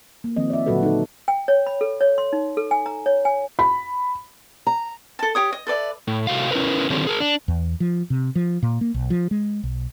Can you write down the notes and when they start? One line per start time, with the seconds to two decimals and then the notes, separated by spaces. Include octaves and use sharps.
0.24 A#3
0.36 D#3 F3 C4 D#5
0.50 D5 E5
0.66 A#2 D3 F#3 F#4 A4 B4
0.83 D#4 A4
1.28 G5
1.48 C#5
1.67 B5
1.81 A4
2.01 C#5
2.18 C6
2.33 D#4
2.57 A4
2.71 G#5
2.86 A#5
3.06 C#5
3.25 G#5
3.59 B5
4.67 A#5
5.19 A4 A5
5.35 G4 C#5 D#6
5.53 D#5
5.67 A4 B4 D5 E5
6.08 A2
6.27 C3 A3 F#4 F5
6.51 C#4 E4 G4 A#4 B4
6.90 D3 D#3 F#3 G3 C4 A4
7.07 G#4 A#4
7.20 D4
7.48 E2
7.80 F3
8.10 C3
8.35 F3
8.62 A#2
8.81 A#3
8.94 B1
9.10 F3
9.31 G#3
9.63 B1